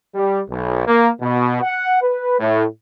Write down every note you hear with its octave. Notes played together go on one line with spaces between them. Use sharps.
G3
B1
A#3
B2
F#5
B4
A2